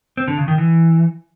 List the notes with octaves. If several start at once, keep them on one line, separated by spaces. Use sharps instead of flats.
C4
D3
C#3
D#3
E3